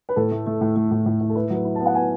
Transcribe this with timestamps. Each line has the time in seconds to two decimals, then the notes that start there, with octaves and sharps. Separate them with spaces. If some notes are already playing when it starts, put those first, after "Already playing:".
0.09 B4
0.16 A2 A4
0.31 A3
0.47 A3
0.61 A2
0.76 A3
0.91 A2
1.06 A2
1.20 A2
1.30 A4
1.36 E4 B4
1.50 F#3 B4
1.65 E4
1.76 A5
1.80 B3
1.86 F#5
1.95 B3 G#5